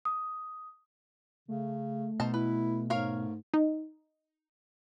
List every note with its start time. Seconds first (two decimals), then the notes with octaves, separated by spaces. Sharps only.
0.05 D#6
1.48 C#3 A3
2.20 B2 D#4 C5 A5
2.34 E4 B4
2.90 G#2 A#4 C#5 F5
3.54 D#4